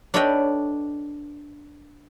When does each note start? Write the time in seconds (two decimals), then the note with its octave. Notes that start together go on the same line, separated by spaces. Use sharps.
0.14 D4 A4 B4 C#5 D#5 G5